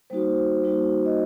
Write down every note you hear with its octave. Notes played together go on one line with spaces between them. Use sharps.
G3 A#3 D#4 F#4 C5
G3 A#3 D#4 F#4
D#5